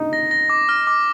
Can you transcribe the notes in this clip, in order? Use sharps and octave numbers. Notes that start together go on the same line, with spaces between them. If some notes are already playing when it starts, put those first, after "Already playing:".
Already playing: D#4
A#6
A#6
D6
F6
D6